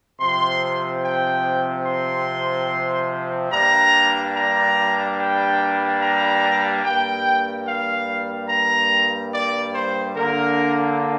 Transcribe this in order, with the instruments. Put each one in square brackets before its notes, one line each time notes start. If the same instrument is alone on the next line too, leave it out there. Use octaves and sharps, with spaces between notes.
[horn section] C3 F3 C4 C6
G5
C6
G2 G3 A#3 D4 A#5
A#5
G5
A#5
G2 G3 A#3 G5
F5
A#5
D5
C5
D3 A#3 D4 A#4